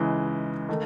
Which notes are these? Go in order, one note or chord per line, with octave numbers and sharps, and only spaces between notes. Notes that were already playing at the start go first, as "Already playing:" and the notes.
Already playing: C#2 C#3 E3 G#3
D#3 A3